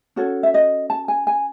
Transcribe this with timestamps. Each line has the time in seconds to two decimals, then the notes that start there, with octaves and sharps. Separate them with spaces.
0.16 C#4 F#4 A4 C#5
0.43 E5
0.54 D#5
0.90 A5
1.08 G#5
1.27 G#5